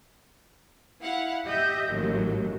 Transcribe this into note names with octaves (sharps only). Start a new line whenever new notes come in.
E4 F5 F#5
G4 D#5 E5 G6
A1 D#2 A2 F#3